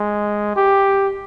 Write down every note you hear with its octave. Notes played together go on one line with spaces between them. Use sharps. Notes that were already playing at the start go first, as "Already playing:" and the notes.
Already playing: G#3
G4